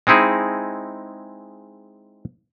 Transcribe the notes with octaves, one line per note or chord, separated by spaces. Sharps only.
G#3 C4 D#4 E4 G#4